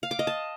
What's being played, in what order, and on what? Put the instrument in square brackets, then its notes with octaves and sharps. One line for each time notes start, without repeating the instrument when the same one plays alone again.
[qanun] F5
D6
D#5
A5